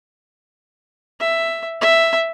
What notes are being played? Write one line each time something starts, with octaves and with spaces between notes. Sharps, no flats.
E5
E5